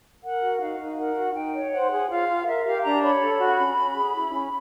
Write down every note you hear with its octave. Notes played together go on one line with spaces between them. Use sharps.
A#4 F#5
F#4
D#4 F5
D#4
A#4 F#5
F#4
D#4 G5
C#5
C5 F#5
G#4
F4 F5
F4
A#4 E5
G4 F5
D4 A#5
C#5 B5
A4
F#4
C#4
C#4
G#4
E4
C#4